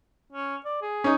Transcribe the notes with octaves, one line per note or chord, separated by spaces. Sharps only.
C#4
D5
G#4
C#4 D#4